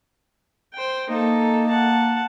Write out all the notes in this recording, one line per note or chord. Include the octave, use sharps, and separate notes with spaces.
C5 G5
A#3 D#4 A4
F#5 A5